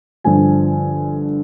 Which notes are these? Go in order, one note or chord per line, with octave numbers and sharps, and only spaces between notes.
G1 G2 D3 F3 G#5